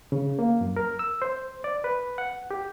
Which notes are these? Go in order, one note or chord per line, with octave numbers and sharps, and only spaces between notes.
C#3
A#3
F#2
A#4
E6
C5
D5
B4
F#5
G4